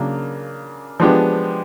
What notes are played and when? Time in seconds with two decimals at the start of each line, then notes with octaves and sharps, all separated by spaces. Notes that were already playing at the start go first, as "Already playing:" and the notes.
Already playing: C#3 F#3 A#3 D4
1.00 F3 G#3 B3 D4 G4